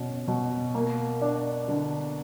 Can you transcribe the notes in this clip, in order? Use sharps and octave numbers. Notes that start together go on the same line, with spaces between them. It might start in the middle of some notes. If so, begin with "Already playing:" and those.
Already playing: B2 C#4
B2
A#3
D4
D3